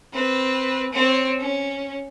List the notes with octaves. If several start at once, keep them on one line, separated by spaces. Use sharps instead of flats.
C4 B4
C4 C#5
C#4